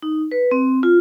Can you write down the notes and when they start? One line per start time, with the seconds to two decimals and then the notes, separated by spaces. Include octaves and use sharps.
0.02 D#4
0.31 B4
0.51 C4
0.83 F4